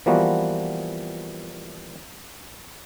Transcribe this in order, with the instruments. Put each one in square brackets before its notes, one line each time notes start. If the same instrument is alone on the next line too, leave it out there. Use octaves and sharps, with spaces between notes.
[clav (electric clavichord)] E3 F3 G3 A#3 B3 F#4